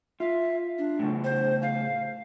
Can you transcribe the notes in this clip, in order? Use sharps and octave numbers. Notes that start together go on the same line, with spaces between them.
F4 E5
D4
A2 C#3
C5
F5